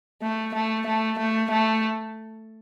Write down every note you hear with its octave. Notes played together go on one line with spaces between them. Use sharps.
A3
A3
A3
A3
A3